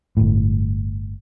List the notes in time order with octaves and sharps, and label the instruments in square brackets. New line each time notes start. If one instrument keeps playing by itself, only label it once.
[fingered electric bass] G1 A2